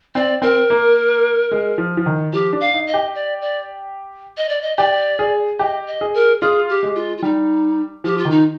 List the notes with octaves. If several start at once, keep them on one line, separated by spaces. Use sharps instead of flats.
C4 D5
C4 A#4
A#3
G#3
F3
F3
D#3
F3 G4
D4
F5
D#4
D#5
G4
D5
D5
D#5
D5
D#5
G4 D5
G#4
G4 D#5
D#5
G#4
A#4
F4 G#4
G4
G#3
F4
F4
G3 D#4
F3 G4
F4
D#3
D#4